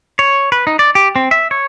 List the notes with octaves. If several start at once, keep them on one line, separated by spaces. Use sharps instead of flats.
C#5
B4
D#4
D5
G4
C4
E5
C#5